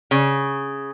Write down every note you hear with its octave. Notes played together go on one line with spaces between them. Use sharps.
C#3